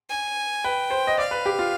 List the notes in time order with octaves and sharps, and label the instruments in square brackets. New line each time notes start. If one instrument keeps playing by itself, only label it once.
[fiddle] G#5
[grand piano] B4 [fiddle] G5
[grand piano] C5
D#5
[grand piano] D5 [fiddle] F5
[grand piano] B4
G4
F4